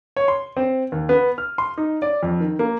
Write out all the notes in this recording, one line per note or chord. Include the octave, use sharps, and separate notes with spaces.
C#5
C6
C4
D#2
B3
F6
C6
D#4
D5
F2
D#3
A#3